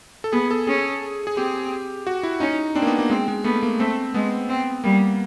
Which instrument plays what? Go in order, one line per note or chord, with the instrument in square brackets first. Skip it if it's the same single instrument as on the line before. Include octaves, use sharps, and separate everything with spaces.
[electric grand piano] A4
[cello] B3 [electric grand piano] G#4
[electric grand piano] A4
[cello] C#4 [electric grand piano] G#4
[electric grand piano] G#4
[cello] C4 [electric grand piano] G4
[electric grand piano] F#4
E4
[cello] C#4 [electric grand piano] D#4
[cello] C4 [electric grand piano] D4
[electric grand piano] A#3
B3
A#3
[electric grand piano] G#3 [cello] C4
[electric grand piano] G#3
[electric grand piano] A3 [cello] B3
[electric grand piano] A#3
[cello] A3 [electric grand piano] C4
[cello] G#3 [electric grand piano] B3
[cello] C4
[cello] G3 [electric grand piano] A#3